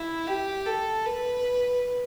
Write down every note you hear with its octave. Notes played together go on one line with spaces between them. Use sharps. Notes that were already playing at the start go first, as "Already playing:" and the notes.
Already playing: E4
G4
A4
B4